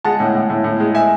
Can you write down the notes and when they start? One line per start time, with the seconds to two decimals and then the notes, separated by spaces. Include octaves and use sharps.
0.04 G#3 F#5 A5
0.20 A2
0.35 A2
0.50 A2
0.64 A2
0.80 G#3
0.95 E5 G#5